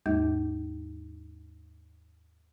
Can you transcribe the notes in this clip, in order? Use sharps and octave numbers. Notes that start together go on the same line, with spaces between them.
D#2 G#2 G#3 A#3 D#4 G6